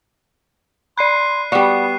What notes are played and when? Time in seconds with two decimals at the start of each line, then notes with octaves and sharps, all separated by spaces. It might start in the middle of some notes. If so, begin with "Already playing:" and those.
0.98 D5 B5 C6 F#6 C7 D#7
1.52 G3 B3 F#4 D5 F#5